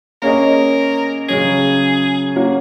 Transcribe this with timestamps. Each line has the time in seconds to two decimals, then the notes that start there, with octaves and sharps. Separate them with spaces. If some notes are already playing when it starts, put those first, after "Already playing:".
0.22 A#3 C#4 G#4 A#4 D#5
1.29 C#3 F#3 C#4 G#4
2.36 A#3 C#4 F#4 A#4